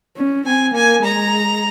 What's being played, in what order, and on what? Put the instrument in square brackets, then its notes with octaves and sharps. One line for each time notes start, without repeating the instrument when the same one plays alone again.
[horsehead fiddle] C#4
[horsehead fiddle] C4 [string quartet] G#5
[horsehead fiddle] A#3 [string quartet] G#5
[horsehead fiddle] G#3 [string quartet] A#5